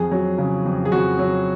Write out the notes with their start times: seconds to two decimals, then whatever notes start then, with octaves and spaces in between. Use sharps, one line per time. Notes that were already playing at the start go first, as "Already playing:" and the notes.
Already playing: F2 G#4
0.12 F#3
0.38 C#3
0.66 F2
0.85 G#4
0.92 F2 F#4
1.19 F#3